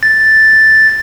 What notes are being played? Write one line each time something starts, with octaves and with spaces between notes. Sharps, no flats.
A6